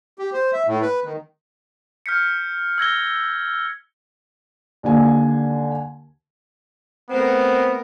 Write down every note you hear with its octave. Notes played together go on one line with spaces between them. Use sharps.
G4
C5
E5
A2
B4
D#3
F6 G6 B6 C#7
E6 G#6 A#6 G7
D#2 D3 G#5
A3 B3 C4 A#4